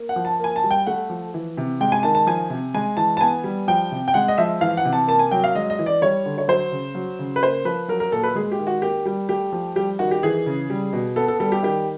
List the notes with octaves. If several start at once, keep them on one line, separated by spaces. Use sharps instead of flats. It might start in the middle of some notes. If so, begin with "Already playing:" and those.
Already playing: A#3
F#5
F3
A5
A#3 G#5
A5
G3
G5
A3 F#5
F3
E3
C3
G#3 G5
G#5
D#3 A5
A5
F3 G#5
C3
G#3 G#5
E3 A5
A5
B3 G#5
G3
F3 G5
C3
G5
G#3 F#5
D#5
F3 E5
E3 F5
F#5
C3
A5
A#3 A5
G#5
F#3 G5
F5
G#3 D#5
D#5
E3
D5
G3 C#5
D3
C#5
F#3 C5
C#3
F#3
C#3
B4
A#3 C5
F3 B4
F#3 A#4
A#4
A#2 A4
B4
G#3 G#4
G4
D#3
F#4
A#3 G4
G3 G4
A3 G4
F3
G3 G4
D#3 F#4
G4
E3 G#4
C#3
G3
B2
B3 A4
A4
G3 A4
G4
D#3 G4